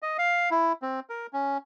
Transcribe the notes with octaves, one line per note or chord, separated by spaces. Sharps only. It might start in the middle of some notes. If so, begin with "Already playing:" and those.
D#5
F5
E4
C4
A#4
C#4